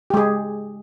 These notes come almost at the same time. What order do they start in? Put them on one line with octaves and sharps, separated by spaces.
G4 G#3 G#4